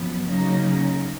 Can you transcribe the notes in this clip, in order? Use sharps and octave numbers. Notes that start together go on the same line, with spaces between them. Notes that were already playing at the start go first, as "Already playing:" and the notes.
Already playing: F#2 F3 B3
C#3 F#3 A#3 D#4